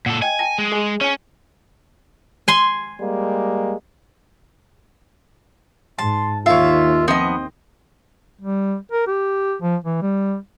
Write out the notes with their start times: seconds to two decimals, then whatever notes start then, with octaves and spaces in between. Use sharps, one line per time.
0.06 A#2 A4 F#5
0.22 D#5 G5 G#5 G#6
0.39 G5 A5 A#6
0.58 G#3
0.72 G#4 D#5 G#5
1.01 C#4 C#5 G#5
2.48 G#5 C6
2.99 G3 G#3 A#3
5.98 G#2 A5 C6
6.46 D#2 D#3 F4 C#5 E5 F5
7.08 F3 B3 C4 D#5
8.41 G3
8.92 A#4
9.07 G4
9.62 F3
9.84 E3
10.02 G3